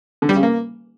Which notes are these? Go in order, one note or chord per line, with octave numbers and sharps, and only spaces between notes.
D3
G3
C#3
A#3